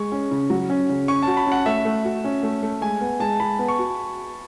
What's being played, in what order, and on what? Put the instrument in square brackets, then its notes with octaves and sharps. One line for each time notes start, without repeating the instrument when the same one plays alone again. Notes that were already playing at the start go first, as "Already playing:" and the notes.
Already playing: [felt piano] G#3 [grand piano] C#6
[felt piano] C#4
C#3
F#3
C#4
C#3
[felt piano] C#4 [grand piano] C#6
[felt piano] F#4 [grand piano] A5
[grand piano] B5
[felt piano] C#4 [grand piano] F#5
[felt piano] A3 [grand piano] E5
[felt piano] A3
F#4
C#4
A3
A3
[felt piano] G#3 [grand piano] G#5
[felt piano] B3
[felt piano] G#3 [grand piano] A5
[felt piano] G#3 [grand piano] B5
[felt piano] B3
[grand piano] C#6
[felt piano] F#4